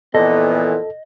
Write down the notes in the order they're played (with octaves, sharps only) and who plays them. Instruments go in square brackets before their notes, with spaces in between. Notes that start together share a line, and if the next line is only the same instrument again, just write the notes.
[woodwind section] F2 A#2 [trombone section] E3 B3 [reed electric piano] A4 [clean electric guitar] D#5